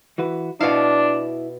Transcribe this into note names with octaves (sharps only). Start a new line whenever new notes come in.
E3 F#4 B4
B2 D4 E4 F5